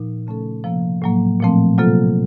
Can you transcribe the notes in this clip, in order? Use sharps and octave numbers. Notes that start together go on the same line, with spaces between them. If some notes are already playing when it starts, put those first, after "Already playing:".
Already playing: A#2 F3 D#4
C#3 A3 C#4 A4
C3 F3 A#3
A2 F#3 A#3
A#2 F3 A3 C4
C3 F#3 A#3 F4 A4